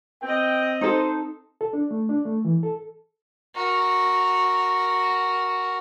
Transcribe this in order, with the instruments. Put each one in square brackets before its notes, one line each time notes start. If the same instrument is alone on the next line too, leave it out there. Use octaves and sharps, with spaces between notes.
[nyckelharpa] C4 D#5 [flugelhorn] G5
[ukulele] D#4 A4 [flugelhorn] C5
[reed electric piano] A4
D4
A3
D4
A3
E3
A4
[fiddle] F#4 A#4